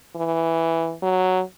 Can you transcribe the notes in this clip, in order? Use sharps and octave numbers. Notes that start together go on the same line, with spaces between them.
E3
F#3